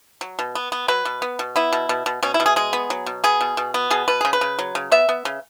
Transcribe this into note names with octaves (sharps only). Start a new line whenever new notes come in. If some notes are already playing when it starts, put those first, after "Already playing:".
F#3
B2
B3
B3
F#3 B4
B2
B3
B2
B3 E4
B2
B2
B2
B2 C#4
E4
B2
G#4
G#3 G#4
B3
F#3
B2
B3 G#4
B2
B2
B3
B2 G#4
B2 B4
C#3 G#4
B4
C#3
F#3
C#3
B3 E5
B3
C#3